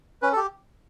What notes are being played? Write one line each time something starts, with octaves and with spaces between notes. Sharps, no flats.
C#4 B4
A4
G4